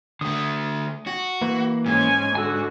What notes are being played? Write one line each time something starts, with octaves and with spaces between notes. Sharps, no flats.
D3 A3 D#6
F#4
E3 A#3 B4
G#2 C#4 G#5
D3 F#4 G#5 E6